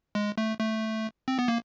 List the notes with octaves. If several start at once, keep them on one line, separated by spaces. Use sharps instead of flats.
G#3
A3
A3
C4
B3
A#3